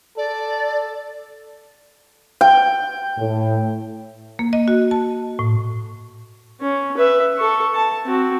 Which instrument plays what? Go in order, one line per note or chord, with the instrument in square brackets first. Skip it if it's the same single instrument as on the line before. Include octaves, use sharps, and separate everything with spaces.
[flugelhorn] A4 [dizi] D5
[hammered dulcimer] G5
[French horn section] A2
[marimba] A#3
D#5
F#4
A5
A2
[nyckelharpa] C#4
B4 E5
A4 C#6
A5
C4 F#4